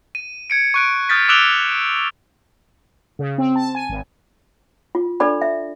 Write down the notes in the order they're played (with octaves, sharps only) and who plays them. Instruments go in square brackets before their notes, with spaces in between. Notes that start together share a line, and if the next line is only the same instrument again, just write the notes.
[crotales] D#7
G#6 C#7 D7
C#6 F#6 D7
D#6 F6 G6 A6 B6
D6 E6 F#6 D7 F7 G7
[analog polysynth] C#3
C4
A5
G#5
G#1
[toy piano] F4
D4 A4 D5 B5
E5